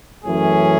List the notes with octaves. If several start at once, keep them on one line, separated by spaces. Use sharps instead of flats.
F#2 E3 A3 C#4 G#4